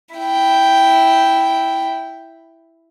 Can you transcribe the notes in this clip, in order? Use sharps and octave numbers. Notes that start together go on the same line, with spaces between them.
E4 G5